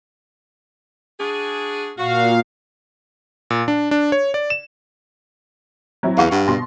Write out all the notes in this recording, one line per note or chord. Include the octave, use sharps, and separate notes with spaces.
D4 F#4 G#4
A#2 F#4 F5
A#2
D4
D4
C#5
D5
E7
F#3 C4 E4
E2 F5 F#5 C#6
G2
B2 C6 A#6